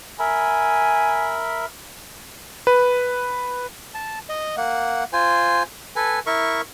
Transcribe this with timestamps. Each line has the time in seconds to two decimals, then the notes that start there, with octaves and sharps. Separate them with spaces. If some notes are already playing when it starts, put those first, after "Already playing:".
0.19 A#4 E5 G#5 B5
2.67 B4
3.94 A5
4.29 D#5
4.57 A#3 F#5
5.13 F4 C5 G#5
5.96 A4 B4 G#5
6.26 E4 A#4 E5 C#6